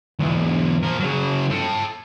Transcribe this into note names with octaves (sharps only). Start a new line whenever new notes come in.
B1 E2
F3 A#4
C#3 F#3
A4 G5